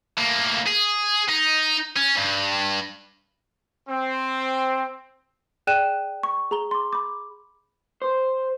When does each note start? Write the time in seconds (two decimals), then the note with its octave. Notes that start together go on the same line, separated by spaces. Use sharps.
0.18 A2 A#3
0.66 G#4
1.29 D#4
1.96 C#4
2.17 G2
3.89 C4
5.67 G#4 D5 G5 F#6 D#7 E7
6.23 C#6
6.51 G#4 A#5 G7
6.71 C6 D6
6.93 B5 D6
8.02 C5